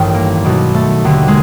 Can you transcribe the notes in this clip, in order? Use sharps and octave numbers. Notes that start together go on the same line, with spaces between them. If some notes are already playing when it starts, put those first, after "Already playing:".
Already playing: A1 G2 D#3
A#3
B1 B2
A3
D#2 D3
G#3